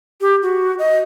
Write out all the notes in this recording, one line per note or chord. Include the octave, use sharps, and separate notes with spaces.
G4
F#4
D#5